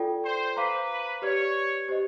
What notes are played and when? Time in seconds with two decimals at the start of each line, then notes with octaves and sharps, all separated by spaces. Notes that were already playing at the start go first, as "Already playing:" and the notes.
Already playing: F4 A4 D5 G5
0.25 C5
0.57 B4 C5 F5 A#5 D6
1.22 G4 B4 C#5 D5
1.88 G4 C5 D#5